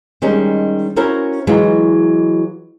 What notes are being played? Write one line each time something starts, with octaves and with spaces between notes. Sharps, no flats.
D#3 G3 G#3 C#4 D#4
C#4 E4 F#4 A#4 C5 C#5
E3 F#3 G#3 D#4 F4 F#4